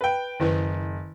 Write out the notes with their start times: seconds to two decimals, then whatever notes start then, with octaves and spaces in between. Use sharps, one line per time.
0.01 B4 G5
0.40 F#1 D#3 E4 B4